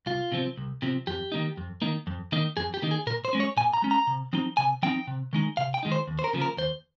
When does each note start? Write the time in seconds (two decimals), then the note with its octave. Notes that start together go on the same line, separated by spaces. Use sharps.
0.06 C2 F4
0.32 C3 F3 C4
0.57 C2
0.82 C3 F3 C4
1.07 F2 G4
1.32 D#3 A#3 D#4
1.57 F2
1.82 D#3 A#3 D#4
2.07 F2
2.32 D#3 A#3 D#4
2.57 F2 G#4
2.74 G4
2.82 D#3 A#3 D#4
2.91 G#4
3.07 A#2 A#4
3.25 C5
3.33 G#3 C#4
3.40 C#5
3.57 A#2 G#5
3.73 A#5
3.82 G#3 C#4
3.91 A#5
4.07 C3
4.33 F3 C4 D#4
4.57 C3 G#5
4.83 F3 C4 D#4 G5
5.07 C3
5.33 D#3 G#3 D#4
5.57 C3 F5
5.74 G5
5.83 D#3 G#3 D#4
5.92 C5
6.07 D#2
6.19 C5
6.24 A#4
6.33 C#3 F3 A#3
6.42 A#4
6.57 D#2 C5